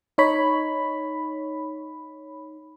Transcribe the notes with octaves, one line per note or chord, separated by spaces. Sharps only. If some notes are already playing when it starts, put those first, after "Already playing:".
D#4 C#5 B5